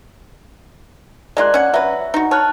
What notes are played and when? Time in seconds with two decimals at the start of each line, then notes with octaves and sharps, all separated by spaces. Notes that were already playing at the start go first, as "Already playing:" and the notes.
1.37 G#3 A#3 F4 D5 F#6
1.54 C#4 F#5
1.74 F#3 B4 E5
2.14 D#4 F#4
2.31 C#5 A5 F6 F#6